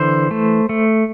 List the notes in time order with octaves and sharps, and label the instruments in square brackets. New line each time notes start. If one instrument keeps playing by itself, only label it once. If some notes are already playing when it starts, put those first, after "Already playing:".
Already playing: [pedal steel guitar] D3 E3 C5
A3
A3